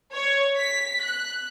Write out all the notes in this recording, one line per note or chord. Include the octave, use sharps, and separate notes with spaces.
C#5
B6
F#6